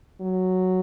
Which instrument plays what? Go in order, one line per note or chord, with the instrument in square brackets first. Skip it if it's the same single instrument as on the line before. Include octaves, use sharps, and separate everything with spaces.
[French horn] F#3